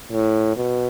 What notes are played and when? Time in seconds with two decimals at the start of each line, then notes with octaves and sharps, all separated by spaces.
0.12 A2
0.57 B2